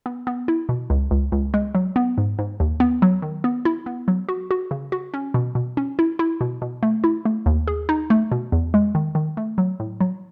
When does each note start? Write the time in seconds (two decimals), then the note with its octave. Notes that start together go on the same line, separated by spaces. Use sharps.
0.06 B3
0.27 B3
0.48 E4
0.69 B2
0.90 C#2
1.11 C#2
1.32 C#2
1.54 G#3
1.75 F#3
1.96 B3
2.18 G#2
2.39 G#2
2.60 D#2
2.80 B3
3.02 F#3
3.22 D#3
3.44 B3
3.65 E4
3.86 B3
4.08 F#3
4.29 F#4
4.51 F#4
4.71 C#3
4.92 F#4
5.14 C#4
5.34 B2
5.55 B2
5.77 C#4
5.99 E4
6.19 E4
6.41 B2
6.62 B2
6.83 A3
7.04 E4
7.25 A3
7.46 D#2
7.67 G#4
7.89 D#4
8.10 A3
8.32 B2
8.52 E2
8.74 G#3
8.95 D#3
9.15 D#3
9.37 A3
9.58 F#3
9.80 A2
10.01 F#3